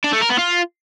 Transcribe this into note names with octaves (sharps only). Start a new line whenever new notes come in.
D4
A3
A#4
B3
F4